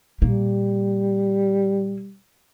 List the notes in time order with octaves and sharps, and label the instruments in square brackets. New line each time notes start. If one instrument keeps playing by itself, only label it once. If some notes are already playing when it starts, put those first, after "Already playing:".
[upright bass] A#2 A#3 [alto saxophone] G3